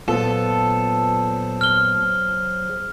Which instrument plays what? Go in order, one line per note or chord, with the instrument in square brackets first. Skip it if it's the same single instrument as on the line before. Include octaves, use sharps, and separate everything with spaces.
[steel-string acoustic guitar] A#2 B3 F4 [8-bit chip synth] F#3 G#4 C5 [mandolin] A4
[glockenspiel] F6 G7